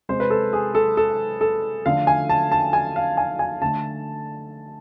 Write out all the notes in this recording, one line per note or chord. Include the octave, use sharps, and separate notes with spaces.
C3 G#3 C5
B4
A4
G#4
A4
A4
A4
D3 F3 A3 F5
G#5
A5
A5
G#5
F5
G#5
G#5
D3 A3 A5